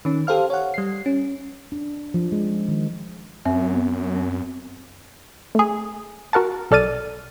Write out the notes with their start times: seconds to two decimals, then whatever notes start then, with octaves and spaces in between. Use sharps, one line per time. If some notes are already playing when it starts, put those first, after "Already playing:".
0.05 D#3 C#4
0.27 G4 A4 C5 F5 F6
0.50 C#5 F#5
0.74 G3 C7
1.06 C#4
1.72 D4
2.14 F3
2.32 G#3
2.68 D#3
3.45 F#2 C4 E5
3.73 B3
4.15 C4
5.55 A3 G#4
6.33 F#4 A#4 F#5 A5
6.71 B1 A4 D5 F6 A6 D#7